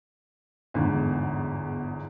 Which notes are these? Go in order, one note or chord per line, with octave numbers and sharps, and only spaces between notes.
G1 E2 G#2 D3